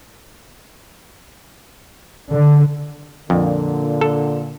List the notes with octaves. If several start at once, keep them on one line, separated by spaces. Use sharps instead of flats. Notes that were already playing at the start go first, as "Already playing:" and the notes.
D3
F2 A#2 D3
A4